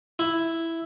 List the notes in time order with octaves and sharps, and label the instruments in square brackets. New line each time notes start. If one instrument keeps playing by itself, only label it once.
[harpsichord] E4